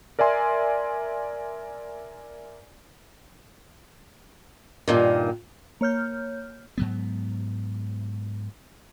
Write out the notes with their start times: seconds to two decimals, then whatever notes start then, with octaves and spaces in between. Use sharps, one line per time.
0.19 A#4 D5 E5 G#5 C6
4.88 G2 A#2 D#3
5.81 A#3 C#5 F6 G6
6.78 G#2 F#3 B3